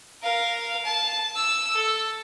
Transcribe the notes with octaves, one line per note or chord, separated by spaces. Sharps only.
A#4 F5
A5
E6
A4